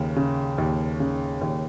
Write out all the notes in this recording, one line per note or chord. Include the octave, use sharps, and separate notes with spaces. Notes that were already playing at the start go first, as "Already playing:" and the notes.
Already playing: D#2 C#3
C#3
D#2
C#3
D#2